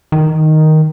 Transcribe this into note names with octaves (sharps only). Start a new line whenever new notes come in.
D#3